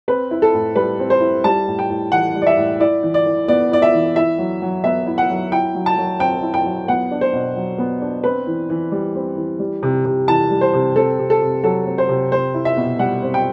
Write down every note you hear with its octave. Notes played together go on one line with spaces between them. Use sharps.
C4 B4
E4
A4
A2
G3 B4
C4
C5
E4
G3 A5
A2
G5
A2
E3 F#5
G3
D5
E5
A2
E4 D5
E3
D5
E3
B3 D5
E4 D5
E5
E3
E4 E5
F#3
F#3
B3 E5
E4
F#5
F#3
E4 G5
F#3
A5
F#3
C4 G5
E4
G5
F#3
B3 F#5
D4
C5
B2
F#3
B3
D4
C4 B4
E3
E3
G3
C4
E3
G3
C3
C3
E3 A5
G3
C5
C3
C4 A4
C3
A4
C3
F#3 A4
C4
C5
C3
C4 C5
E4
E5
B2
G3 F#5
C4
G5